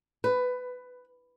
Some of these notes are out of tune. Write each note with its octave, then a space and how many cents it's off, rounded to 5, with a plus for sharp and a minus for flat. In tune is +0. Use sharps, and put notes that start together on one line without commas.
B4 +15